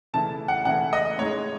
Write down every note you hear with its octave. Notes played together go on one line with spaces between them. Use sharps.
C#3 E3 A3 E4 A5
F#5
C#3 E3 A3 E4 F#5
D#5
A2 G#3 D#4 C#5